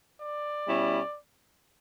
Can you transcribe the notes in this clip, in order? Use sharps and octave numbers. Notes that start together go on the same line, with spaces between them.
D5
B2 G3 C#4 E4